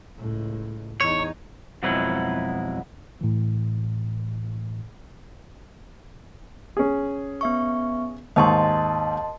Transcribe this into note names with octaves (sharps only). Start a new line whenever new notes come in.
C#2 A2
E2 D#4 C#5
F2 B2 F#3 G#3 E4 B4
A2 E3
C#4 G#4
B3 E5 C#6
D#2 G#2 D#5 A5 C6 C#6